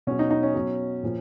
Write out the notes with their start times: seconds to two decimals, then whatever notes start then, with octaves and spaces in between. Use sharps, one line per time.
0.07 B2 F#3 C#4
0.19 D#4
0.31 D#4
0.43 C#4
0.55 B2 F#3
1.03 A#2 F3